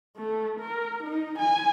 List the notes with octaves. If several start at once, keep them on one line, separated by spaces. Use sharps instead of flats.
A3
A#4
D#4
G#5